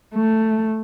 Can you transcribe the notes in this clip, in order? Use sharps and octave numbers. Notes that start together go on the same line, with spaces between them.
A3